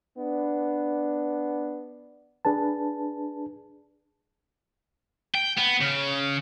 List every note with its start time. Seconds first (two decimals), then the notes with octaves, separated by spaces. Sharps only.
0.18 B3 D4
2.45 D4 G#4 B4 A5
5.35 G5
5.58 B3
5.81 C#3